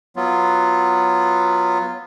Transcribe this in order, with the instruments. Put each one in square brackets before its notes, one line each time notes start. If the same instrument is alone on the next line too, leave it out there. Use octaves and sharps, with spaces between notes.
[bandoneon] F#3 B3 F4